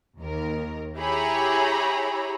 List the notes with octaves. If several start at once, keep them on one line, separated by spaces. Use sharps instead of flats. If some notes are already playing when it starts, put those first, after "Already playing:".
D#2 A#4
E4 G4 G#4 C#5 A#5 B5